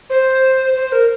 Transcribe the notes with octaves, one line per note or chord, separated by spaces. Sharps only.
C5
C5
A#4